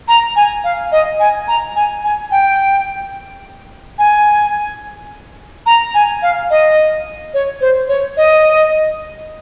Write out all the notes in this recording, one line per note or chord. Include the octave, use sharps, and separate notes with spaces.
A#5
G#5
F5
D#5
G#5
A#5
G#5
G#5
G5
G#5
A#5
G#5
F5
D#5
C#5
C5
C#5
D#5